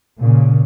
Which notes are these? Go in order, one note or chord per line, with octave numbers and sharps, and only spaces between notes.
A#2 C#3